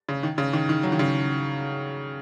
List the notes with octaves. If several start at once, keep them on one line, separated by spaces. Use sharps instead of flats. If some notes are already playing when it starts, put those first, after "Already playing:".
C#3
D#3
C#3
D#3
D#3
F#3
D#3
C#3